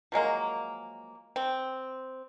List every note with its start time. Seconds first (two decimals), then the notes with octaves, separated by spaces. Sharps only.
0.12 F3 F#3 G#3 A#3
1.36 C4